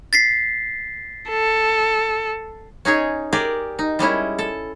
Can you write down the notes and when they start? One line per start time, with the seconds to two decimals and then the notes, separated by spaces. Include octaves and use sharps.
0.13 A6 B6 C7
1.29 A4
2.85 C#4 D#4 G#4 C#5
3.33 G4 G#4 A#4 D5
3.79 D#4
3.99 G3 G#3 C#4 E4
4.39 A4